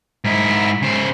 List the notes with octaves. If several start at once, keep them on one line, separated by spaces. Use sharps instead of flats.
G#2 E4
C#3 C5